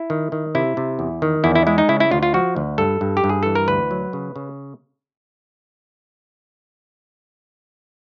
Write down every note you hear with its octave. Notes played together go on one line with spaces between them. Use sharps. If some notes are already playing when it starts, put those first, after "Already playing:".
Already playing: E4
D#3
D#3
C3 E4
C3
E2
D#3
E2 E4
E4
G#3 E4
D#4
C#3 E4
E4
D2 F4
F4
F3 F#4
D2
G2 A4
G2
G4
G2
G#4
E3 A4
A#4
D2 B4
F#3
C#3
C#3